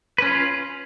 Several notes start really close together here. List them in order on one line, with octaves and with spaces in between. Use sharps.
B4 C#4 F4